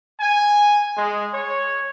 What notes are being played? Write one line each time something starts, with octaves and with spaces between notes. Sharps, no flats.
G#5
G#3
C#5